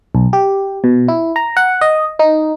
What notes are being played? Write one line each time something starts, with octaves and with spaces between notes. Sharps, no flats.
B1
G4
B2
E4
A#5
F#5
D#5
D#4